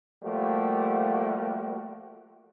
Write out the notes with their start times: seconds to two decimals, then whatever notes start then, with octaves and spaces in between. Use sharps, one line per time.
0.24 F3 G3 A3 A#3 F#4 G4